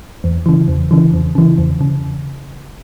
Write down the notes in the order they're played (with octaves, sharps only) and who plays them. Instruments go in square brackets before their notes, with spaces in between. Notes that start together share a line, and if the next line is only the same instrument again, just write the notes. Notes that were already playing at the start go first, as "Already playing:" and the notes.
[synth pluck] E2
C#3 E3
E2
C#3 E3
E2
C#3 E3
E2
C#3